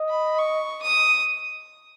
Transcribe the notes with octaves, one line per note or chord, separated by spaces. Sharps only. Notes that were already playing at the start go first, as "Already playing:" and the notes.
Already playing: D#5
B5
C#6
D#6